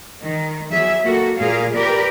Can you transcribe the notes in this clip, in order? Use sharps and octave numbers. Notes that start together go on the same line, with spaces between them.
D#3
E2 F#3 G#4 E5
A#3 F#4 A4
A#2 G#4 A#4 F5
G4 A#4 B4 D5